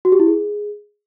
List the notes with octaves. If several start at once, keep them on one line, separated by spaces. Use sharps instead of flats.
F#4
G4
E4
G#4